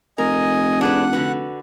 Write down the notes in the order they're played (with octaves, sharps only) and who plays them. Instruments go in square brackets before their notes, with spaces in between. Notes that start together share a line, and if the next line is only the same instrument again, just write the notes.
[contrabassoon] F1 [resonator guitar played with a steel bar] A#4 [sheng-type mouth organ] D#5 G#5
[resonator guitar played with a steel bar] D4 G#4 B4 [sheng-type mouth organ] F#5
[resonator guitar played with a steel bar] D3 F#4 B4